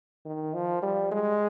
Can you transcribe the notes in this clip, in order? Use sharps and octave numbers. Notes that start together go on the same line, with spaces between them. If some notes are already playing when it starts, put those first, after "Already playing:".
D#3
F3
G3
G#3